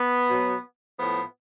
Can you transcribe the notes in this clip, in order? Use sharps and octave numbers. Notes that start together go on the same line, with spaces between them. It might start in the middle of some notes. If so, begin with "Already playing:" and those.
Already playing: B3
B2 F#3
A2 F3 B3